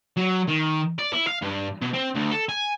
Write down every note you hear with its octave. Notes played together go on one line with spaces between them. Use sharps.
F#3
D#3
D5
E4
F5
G2
B2
C4
D2
A4
G#5